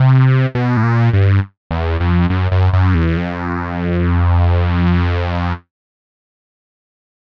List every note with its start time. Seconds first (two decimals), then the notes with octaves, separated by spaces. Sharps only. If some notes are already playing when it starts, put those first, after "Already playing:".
Already playing: C3
0.55 B2
0.77 A2
0.83 A#2
1.13 G2
1.71 E2
2.00 F2
2.30 F#2
2.52 F#2
2.73 F#2
2.95 E2
3.17 F2